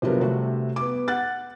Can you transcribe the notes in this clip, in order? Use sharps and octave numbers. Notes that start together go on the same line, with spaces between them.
C3 F3 F#3 B3 D4 A#4
C3 G3 A3 F#4
B3 D6
F#5 F#6 A6